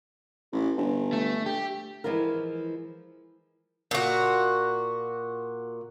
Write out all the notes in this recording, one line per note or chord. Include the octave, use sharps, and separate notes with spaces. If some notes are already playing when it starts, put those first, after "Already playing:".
A1
G1
A3
G4
E3 F3 G#3 F4 A#4
A#2 F#4